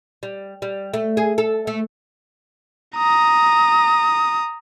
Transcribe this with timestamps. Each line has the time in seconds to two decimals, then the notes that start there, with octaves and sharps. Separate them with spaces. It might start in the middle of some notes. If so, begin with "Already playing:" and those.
0.23 G3
0.62 G3
0.94 A3
1.17 G#4
1.38 A4
1.67 A3
2.96 A#5 D#6